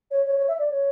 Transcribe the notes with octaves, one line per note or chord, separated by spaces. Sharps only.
C#5
C#5
C#5
E5
D5
C#5